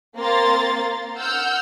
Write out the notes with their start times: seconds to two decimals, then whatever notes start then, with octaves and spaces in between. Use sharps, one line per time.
0.17 A#3 C4 A#5 C6 A6
1.17 F#5 E6 F6 G6